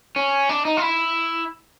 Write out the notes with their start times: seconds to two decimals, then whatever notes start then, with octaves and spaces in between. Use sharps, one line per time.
0.16 C#4
0.49 D4
0.65 D#4
0.77 F4
0.82 E4